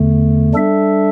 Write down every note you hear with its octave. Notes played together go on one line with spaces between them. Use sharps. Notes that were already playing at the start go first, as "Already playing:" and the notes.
Already playing: E2 D3 A3
G3 D4 A4 E5